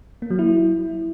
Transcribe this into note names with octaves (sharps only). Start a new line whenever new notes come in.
A#3
F#3
E4